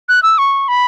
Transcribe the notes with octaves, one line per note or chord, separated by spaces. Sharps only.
F#6
E6
C#6
B5